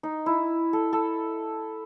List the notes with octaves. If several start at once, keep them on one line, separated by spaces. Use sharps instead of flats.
D#4
E4
A4
A4